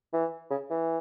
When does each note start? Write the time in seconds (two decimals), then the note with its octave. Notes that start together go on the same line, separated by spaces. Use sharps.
0.13 E3
0.50 C#3
0.70 E3